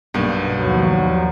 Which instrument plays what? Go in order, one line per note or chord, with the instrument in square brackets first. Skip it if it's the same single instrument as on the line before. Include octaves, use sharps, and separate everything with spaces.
[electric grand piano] B1 G2 [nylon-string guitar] B2 A#3 B3
[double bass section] D#2 F3 [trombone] F#3